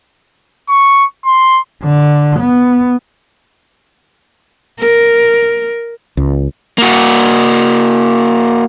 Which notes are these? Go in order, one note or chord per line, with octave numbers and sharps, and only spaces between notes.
C#6
C6
D3
B3
A#4
C#2
A#3 F#4